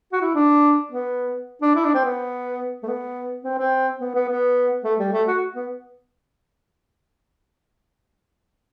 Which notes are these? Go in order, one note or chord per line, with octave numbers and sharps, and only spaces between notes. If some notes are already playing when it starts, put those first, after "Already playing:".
F#4
E4
D4
B3
D4
E4
D4
C4
B3
A3
B3
C4
C4
B3
B3
B3
A3
G3
A3
F#4
B3